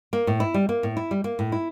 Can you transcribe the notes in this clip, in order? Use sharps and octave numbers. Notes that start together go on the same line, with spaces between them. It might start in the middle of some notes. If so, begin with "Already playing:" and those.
A#3
A2
E4
G3
A#3
A2
E4
G3
A#3
A2
E4